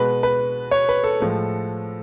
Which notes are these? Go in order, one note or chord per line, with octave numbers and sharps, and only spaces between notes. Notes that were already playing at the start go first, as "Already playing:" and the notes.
Already playing: B2 G#3 B4
B4
C#5
B4
A4
A2 F3 G#3